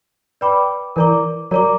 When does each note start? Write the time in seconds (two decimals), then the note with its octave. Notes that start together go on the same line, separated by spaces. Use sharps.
0.41 B4 D5 G5 B5 D6
0.96 E3 A#4 D5 A#5 D6
1.51 F#3 A#4 D5 A#5 D6